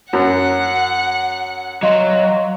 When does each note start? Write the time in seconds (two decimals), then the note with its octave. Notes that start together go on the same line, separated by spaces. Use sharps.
0.13 F#2 F#4 F#5
1.83 F#3 D#5 F5 C6